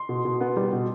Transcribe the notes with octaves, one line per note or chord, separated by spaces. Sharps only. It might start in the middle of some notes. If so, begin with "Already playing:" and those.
Already playing: C6
B2
B2
B3
G3
B2